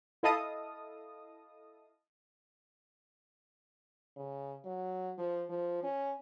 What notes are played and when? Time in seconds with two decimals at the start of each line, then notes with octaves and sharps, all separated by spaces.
0.23 E4 A4 D#5 F5 A5 D#6
4.16 C#3
4.64 F#3
5.18 F3
5.49 F3
5.83 C#4